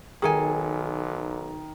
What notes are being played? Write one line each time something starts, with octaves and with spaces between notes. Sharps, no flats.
B1 D#3 G#4 A4 G#5